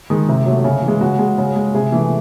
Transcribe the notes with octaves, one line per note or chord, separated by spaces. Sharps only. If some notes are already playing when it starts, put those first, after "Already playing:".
D#3 G#3
C3
F#3 A3
C#3
E3
G#3
C#3 F#4
G#3
C#3
G#3
C3 G#4
E3 A3